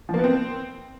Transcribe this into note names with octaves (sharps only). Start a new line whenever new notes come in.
F3
A#3
B3
C4